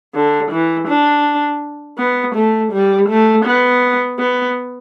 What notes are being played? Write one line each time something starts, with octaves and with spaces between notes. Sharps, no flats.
D3
E3
D4
B3
A3
G3
A3
B3
B3